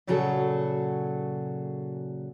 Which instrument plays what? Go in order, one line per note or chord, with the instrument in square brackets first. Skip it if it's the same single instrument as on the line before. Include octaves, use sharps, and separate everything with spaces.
[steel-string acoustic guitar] A#2 C#3 F#3 F#4 G#4 A4